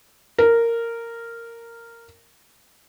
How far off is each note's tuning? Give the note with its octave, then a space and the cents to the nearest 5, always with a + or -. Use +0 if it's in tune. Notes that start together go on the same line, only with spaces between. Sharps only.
A#4 -10